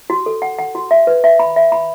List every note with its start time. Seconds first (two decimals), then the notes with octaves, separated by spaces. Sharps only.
0.10 F#4
0.26 A4
0.42 F#5
0.58 F#5
0.75 F#4
0.91 E5
1.07 B4
1.24 E5
1.39 B5
1.56 E5
1.72 B5